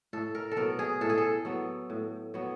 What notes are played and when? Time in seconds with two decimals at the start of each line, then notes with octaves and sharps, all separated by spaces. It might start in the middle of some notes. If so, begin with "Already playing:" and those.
0.13 A2 A4
0.35 A#4
0.51 A4
0.57 F#3 B3 A#4
0.79 G#4
1.01 A2 A4
1.10 G#4
1.18 A4
1.45 F#3 B3
1.90 A2
2.34 F#3 B3